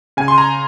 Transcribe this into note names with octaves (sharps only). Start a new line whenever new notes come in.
C#3 G#5
C6
A#5